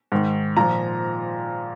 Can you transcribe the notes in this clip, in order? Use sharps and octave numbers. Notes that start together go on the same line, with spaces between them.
G#2 D#3
A#2 F3 A#5